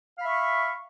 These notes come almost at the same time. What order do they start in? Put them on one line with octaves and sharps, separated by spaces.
F5 B5 E5 C#6